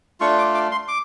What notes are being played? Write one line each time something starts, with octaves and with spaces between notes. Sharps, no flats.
A3 D4 F4 C#6
D6
D6
C6
D6